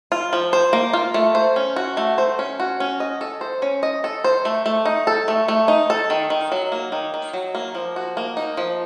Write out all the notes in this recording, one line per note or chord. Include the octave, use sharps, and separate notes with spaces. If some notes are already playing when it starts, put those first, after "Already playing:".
F4
F3
C5
A#3
F4
A3
C5
C#4
F#4
A3
C5
C#4
F#4
C#4
D#5
A4
C5
C#4
D#5
A4
C5
A3
A3
D#4
A4
A3
A3
D#4
A4
D#3
D#3
F#3
A#3
D#3
D#3
F#3
A#3
F3
F#4
A#3
D#4
F3